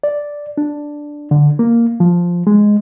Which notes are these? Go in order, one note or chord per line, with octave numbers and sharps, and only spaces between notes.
D5
D4
D3
A#3
F3
G#3